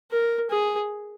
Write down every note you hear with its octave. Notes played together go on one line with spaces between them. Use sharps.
A#4
G#4